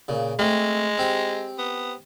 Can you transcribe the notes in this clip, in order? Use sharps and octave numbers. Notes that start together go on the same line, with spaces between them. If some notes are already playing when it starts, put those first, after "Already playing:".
A#2 C#3
G#3 A3 C4
C4 G4
B3